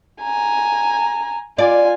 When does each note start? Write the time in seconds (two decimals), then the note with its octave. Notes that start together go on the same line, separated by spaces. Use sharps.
0.21 G#5 A#5
1.58 F4 D5 G#5